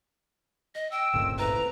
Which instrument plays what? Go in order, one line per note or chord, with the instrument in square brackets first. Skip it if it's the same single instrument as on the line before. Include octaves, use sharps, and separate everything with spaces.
[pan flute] D#5 [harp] A#6
[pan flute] G5 [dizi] E6
[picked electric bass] D1 G1 C#3 [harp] A#2 A3 C4
[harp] E4 A4 E5 [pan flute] B4 [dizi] A#5